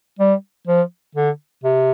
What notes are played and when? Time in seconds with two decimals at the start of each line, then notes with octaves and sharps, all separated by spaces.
0.19 G3
0.68 F3
1.16 D3
1.64 C3